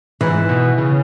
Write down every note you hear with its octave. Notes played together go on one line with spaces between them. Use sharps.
G#2 E3
B2
C#3